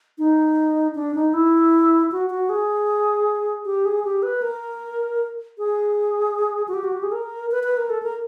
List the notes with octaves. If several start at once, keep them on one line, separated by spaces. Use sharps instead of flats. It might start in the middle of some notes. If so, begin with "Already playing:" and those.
D#4
D4
D#4
E4
F#4
F#4
G#4
G4
G#4
G4
B4
A#4
G#4
F#4
G4
F#4
G4
G#4
A#4
B4
B4
A#4
A4
A#4